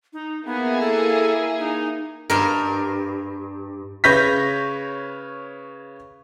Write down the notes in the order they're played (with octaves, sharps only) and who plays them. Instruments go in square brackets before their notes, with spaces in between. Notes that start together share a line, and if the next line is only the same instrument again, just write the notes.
[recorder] D#4
[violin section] A#3 E4 G#4 [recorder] B3
[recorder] A4
D#4
[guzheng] G2 A#4
[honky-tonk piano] C#3 B4 C#5 G6 A#6 B6